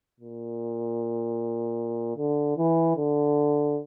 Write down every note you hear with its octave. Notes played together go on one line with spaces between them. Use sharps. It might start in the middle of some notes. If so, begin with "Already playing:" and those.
A#2
D3
E3
D3